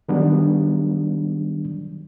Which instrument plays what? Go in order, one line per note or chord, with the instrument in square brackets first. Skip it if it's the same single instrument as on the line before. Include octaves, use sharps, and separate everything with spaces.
[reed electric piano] D#3 F#3 G3 B3 D4